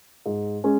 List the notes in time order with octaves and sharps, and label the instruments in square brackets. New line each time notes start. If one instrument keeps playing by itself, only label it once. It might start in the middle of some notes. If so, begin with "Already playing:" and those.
[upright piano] G#2
G#3 C#4